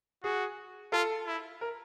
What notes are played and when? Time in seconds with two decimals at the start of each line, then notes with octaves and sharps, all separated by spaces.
0.24 F#4 G#4
0.92 F4 A4
1.27 E4
1.61 A#4